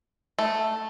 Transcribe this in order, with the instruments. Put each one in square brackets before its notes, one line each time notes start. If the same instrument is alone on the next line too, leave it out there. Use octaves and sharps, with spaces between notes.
[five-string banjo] A3